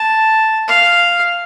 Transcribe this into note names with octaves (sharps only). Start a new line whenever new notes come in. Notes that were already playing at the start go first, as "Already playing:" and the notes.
Already playing: A5
F5